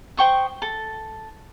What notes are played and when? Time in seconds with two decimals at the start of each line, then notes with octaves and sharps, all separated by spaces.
0.17 C5 G5 C#6 D#6
0.62 A4